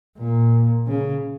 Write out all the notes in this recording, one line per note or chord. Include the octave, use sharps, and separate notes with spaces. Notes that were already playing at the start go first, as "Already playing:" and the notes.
A#2
C#3